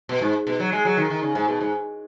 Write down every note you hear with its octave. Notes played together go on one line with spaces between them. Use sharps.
B2
G#2
B2
F#3
G#3
F#3
D#3
D#3
C#3
G#2
B2
G#2